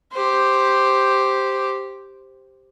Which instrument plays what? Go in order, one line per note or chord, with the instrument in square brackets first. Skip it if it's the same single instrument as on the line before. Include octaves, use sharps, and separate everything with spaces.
[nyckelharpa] G4 C5